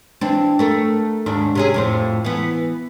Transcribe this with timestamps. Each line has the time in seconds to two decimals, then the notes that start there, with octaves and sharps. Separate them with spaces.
0.21 E3 C4 D4
0.59 A3 A4 A#4
1.26 D#2 G#2 D4
1.55 C3 C#4 G#4
1.74 F2 A2 C5
2.25 E3 B3